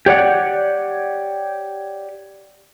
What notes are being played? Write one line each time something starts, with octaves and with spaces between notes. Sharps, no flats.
G4 C#5 D5 F#5